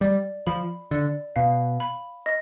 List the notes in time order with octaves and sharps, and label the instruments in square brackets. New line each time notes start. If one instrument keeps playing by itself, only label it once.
[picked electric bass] G3 [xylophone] D5
[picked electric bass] F3 [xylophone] B5
[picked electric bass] D3 [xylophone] D5
[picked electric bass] B2 [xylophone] F5
[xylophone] B5
D#5